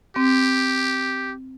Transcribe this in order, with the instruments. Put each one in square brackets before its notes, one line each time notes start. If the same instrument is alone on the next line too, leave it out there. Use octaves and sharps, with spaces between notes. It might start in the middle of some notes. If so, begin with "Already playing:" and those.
[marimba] C4 [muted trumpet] G4